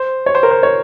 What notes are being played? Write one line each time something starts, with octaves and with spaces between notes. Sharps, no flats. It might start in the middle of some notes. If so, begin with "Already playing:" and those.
Already playing: C5
C#5
C5
A#4
C5
C#5